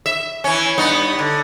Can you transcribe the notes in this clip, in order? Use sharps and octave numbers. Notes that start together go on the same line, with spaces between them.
E5
E3 C#4
G2 B3 D#4
D3